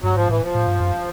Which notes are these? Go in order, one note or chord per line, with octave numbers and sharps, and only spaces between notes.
G2 F#3
G#2 F3
A2 E3
F3
A2
G2
F#2